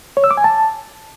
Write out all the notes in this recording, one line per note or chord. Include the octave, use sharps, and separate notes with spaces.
C#5
E6
D6
G#5
A5